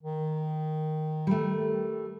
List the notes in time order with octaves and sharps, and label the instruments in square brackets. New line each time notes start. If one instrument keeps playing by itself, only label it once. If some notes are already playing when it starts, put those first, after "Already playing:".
[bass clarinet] D#3
[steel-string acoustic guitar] G3 A3